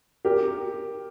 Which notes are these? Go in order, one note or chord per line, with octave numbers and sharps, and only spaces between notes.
G4 A#4